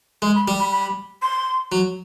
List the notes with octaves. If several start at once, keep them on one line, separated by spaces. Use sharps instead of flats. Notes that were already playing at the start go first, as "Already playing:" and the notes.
G#3 C6
B5
G3
B5
B5
C6
F#3